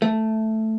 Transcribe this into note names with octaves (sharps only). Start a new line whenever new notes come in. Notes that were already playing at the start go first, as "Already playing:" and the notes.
A3